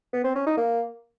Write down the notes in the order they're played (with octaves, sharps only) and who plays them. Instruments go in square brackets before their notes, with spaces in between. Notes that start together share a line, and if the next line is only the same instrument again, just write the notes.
[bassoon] B3
C4
C#4
D#4
A#3